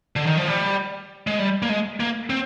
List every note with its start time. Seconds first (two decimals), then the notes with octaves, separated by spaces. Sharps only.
0.16 D3
0.26 D#3
0.37 F3
0.48 G3
1.27 G#3
1.39 G3
1.62 A#3
1.69 G#3
2.00 A#3
2.30 C4